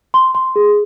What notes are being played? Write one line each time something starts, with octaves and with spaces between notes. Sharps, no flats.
C6
C6
G#4